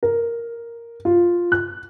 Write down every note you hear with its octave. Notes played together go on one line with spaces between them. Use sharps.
A#4
F4
F#6